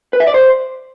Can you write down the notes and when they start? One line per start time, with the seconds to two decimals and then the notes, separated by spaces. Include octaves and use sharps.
0.13 B4
0.20 E5
0.27 D5
0.34 C5